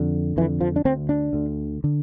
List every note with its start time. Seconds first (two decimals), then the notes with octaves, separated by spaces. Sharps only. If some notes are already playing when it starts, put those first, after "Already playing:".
Already playing: F2 D3
0.37 F2 E3
0.41 D3
0.61 F3
0.76 D4
0.85 D2 D3 C4
1.09 D4
1.33 D2 D3
1.84 D3